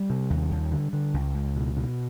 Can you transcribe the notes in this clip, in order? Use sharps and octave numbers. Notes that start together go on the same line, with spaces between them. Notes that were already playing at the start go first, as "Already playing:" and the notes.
Already playing: G3
C3
D#2
D#2
D3
D3
C#2
C#2
B2
B2